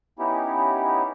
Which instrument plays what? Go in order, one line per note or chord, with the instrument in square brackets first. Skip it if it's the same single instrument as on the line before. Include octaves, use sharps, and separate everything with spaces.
[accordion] B3 C#4 D#4 E4 G4